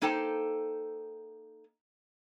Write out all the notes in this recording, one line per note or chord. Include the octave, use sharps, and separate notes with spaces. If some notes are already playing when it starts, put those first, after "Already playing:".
A#3 D#4 A4 C5 G5 A5